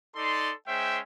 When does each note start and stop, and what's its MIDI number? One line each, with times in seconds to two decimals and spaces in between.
0.15 0.52 63
0.15 0.52 69
0.15 0.52 74
0.15 0.52 84
0.67 0.99 56
0.67 0.99 61
0.67 0.99 72
0.67 0.99 76
0.67 0.99 79